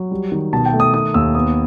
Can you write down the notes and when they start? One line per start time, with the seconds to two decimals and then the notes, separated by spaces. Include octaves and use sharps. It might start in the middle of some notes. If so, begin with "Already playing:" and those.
Already playing: F#3
0.11 G3
0.32 D#3
0.53 B2 A5
0.66 G5
0.73 A3
0.80 D#6
0.94 D#3 D#6
1.14 D#2 E6
1.35 B3 D#6